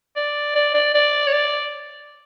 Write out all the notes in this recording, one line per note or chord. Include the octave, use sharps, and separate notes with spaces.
D5
D5
D5
D5
C#5
D5